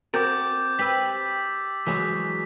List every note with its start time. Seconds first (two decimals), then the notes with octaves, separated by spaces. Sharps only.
0.14 C4 F#4 A#4 D6 G6 A6
0.79 G4 B4 E6 B6
1.87 E3 F#3 G#3 B6